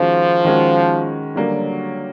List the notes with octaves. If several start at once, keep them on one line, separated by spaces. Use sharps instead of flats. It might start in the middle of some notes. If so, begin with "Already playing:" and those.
Already playing: D#3 F3 G#3 C#4 F#4
D#3 G#3 C#4 F#4
D3 F#3 G3 A#3